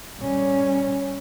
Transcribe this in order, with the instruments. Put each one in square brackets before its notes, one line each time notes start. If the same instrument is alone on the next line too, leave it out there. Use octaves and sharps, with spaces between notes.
[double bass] G3 C#4